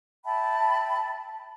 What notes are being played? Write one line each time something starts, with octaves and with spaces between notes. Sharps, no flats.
E5 G5 A5 B5